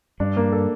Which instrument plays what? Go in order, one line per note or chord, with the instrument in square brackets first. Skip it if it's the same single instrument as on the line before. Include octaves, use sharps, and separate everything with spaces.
[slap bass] G2 [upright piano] D4
[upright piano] A#3
A4